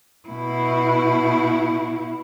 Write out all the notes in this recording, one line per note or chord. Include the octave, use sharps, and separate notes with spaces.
B2 E4